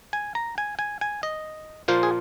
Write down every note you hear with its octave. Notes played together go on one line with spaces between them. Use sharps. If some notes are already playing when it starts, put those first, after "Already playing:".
G#5
A#5
G#5
G#5
G#5
D#5
A#2 F3 A#3 F4 C5
G#4